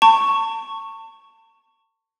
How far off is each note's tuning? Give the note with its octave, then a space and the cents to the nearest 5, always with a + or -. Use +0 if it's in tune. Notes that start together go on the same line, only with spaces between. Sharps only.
A5 +40 C#6 +0